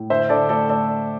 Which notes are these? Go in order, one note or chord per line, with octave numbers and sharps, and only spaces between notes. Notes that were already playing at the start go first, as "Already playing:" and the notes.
Already playing: A2
D3 C5 E5
D3 A4 D5
A3 A4 D5
A3 A4 D5